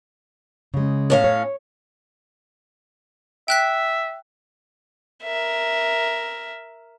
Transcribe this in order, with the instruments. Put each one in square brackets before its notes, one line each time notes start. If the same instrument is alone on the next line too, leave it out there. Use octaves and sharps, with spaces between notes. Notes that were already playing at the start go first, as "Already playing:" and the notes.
[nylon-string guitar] C#3 G#3
[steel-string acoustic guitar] A2 C#4 F5
[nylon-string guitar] C#5
[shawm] E5 [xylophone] G5 F#6 B6
[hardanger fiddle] A#4 E5